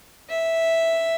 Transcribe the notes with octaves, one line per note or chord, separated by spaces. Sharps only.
E5